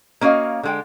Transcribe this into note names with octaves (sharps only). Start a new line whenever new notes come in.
A#3 C#4 F#4 D#5 F5
D3 G#3 G5